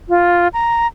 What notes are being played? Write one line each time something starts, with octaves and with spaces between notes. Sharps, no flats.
F4
A#5